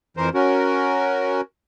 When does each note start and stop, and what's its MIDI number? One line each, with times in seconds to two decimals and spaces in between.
0.17 0.29 41
0.17 0.29 52
0.17 0.29 70
0.17 0.29 72
0.34 1.41 61
0.34 1.41 66
0.34 1.41 70